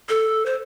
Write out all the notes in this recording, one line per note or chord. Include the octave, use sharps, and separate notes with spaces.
A4
C5